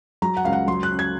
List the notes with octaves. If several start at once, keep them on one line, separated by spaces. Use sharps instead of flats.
F#3 A#5
F#5
C#2 F5
F#5
F#3 C6
F#6
C#4
G#6